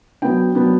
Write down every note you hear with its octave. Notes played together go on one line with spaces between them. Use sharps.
F#3 B3 D4 G5
F#3 B3 D4